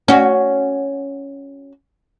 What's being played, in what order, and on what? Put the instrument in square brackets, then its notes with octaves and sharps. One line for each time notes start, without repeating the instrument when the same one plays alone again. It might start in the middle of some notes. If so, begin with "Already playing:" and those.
[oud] C#4 F#4